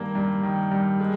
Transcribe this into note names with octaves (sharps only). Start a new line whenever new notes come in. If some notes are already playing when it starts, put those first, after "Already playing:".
Already playing: G2 D#3 A#3
G2
D#3
G2
G#3